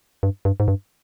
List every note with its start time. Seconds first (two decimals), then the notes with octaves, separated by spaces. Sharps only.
0.23 G2
0.45 G2
0.60 G#2
0.68 G2